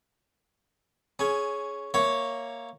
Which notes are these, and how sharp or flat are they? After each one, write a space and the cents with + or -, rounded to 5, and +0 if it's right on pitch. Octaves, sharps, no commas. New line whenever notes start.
C#4 +0 G#4 +15
A#3 +0 C#5 +0 E5 +0